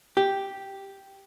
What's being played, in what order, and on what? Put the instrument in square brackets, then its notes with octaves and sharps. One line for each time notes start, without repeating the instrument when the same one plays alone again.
[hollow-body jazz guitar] G4